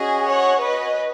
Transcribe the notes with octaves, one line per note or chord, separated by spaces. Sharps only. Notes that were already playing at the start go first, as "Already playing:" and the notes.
Already playing: C#4 F#4 G#4 D#5
C#5 F#5
B4 D#5